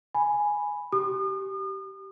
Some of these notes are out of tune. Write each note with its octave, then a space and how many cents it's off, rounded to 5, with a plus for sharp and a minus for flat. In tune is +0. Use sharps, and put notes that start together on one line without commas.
G#5 +0 B5 +0
G4 -20 D#6 -40